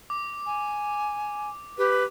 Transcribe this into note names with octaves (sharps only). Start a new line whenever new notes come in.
D6
G#5
G4 B4